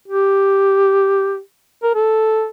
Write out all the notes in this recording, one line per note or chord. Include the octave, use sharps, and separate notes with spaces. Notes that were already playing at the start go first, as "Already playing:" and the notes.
G4
A#4
A4